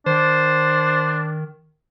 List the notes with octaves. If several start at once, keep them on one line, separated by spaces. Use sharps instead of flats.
D#3 D4 C5